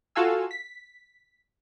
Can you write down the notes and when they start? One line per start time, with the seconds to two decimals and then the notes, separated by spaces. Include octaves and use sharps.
0.16 F4 F#4 A4 F5 G#5 E6
0.51 B6